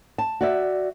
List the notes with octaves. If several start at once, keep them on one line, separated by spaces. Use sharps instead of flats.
A5
F#4 D5 E5